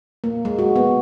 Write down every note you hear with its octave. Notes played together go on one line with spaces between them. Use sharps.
A#3
G#3
F#4
B3